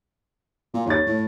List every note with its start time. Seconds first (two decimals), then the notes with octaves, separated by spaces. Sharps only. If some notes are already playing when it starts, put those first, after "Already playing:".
0.74 A#2
0.86 D#2 C#5 A6
1.06 A2